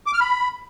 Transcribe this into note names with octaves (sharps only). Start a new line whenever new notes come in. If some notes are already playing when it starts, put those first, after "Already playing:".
D6
F6
B5